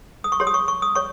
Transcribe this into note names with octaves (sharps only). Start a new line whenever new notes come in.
D#6
C#6
G4 C#5 C6
D#6
C#6
C#6
D#6
C#5 C#6